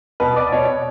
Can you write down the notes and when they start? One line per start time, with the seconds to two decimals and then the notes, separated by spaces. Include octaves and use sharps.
0.20 B2 B4
0.36 D5
0.52 B2 C#5